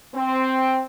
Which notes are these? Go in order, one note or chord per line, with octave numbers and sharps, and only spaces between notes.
C4